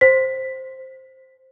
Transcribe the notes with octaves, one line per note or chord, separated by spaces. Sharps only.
C5 B6